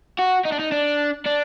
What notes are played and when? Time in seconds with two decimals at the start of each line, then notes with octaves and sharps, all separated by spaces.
0.19 F#4
0.45 D#4
0.52 D4
0.59 D#4
0.72 D4
1.25 D4